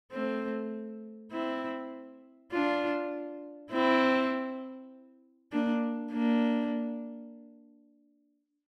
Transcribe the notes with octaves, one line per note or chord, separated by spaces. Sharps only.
A3 C4
C4 E4
D4 F4
C4 E4
A#3 D4
A#3 D4